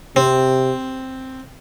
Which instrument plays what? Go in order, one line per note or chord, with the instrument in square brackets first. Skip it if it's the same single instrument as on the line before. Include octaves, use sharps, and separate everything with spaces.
[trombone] C3 [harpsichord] C4